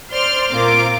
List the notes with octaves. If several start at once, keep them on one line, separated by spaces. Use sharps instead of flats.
C5 D5 C6 F6
A#2 C4 F4 A#4 D6